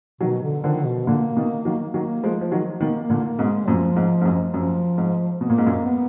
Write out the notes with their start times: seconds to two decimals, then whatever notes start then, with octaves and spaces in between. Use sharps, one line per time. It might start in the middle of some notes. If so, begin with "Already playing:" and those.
0.21 B2 D#3 F#3
0.43 D3
0.64 D3 D#3 F3
0.85 B2
1.07 A#2 D3 A#3
1.36 B2 D#3
1.65 D#3 F#3
1.94 D#3 F#3 A#3
2.23 F3 G#3
2.41 F3
2.52 D#3 F#3
2.81 B2 D#3 A#3
3.03 A#3
3.10 A#2 D3
3.24 A#3
3.39 G#2 B2
3.46 G#3
3.68 F#2 A#2 F3
3.96 G#2
4.21 G#2
4.25 F#2
4.54 F#2 F3
4.98 G#2
5.41 B2 A#3
5.50 A#2
5.58 G#2
5.67 F#2 A#2
5.85 B3